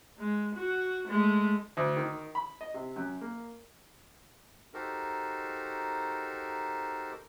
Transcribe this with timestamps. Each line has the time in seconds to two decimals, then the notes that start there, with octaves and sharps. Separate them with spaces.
0.18 G#3
0.55 F#4
1.08 G#3 A3
1.77 D2
1.97 D#3
2.35 B5
2.61 D#5
2.74 C3
2.96 F#2
3.21 A#3
4.74 D#4 F#4 G4 A4 A#4 C5